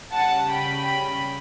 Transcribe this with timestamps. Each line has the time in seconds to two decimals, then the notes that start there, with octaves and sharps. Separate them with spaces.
0.12 C#3 G3 C#4 F#5 A5
0.51 G5 B5